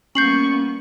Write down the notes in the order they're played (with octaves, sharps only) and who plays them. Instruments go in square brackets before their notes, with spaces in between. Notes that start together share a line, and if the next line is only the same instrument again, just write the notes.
[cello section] G3 A#3 B3 [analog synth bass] C#4 [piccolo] C#6 [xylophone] G6 C7 F#7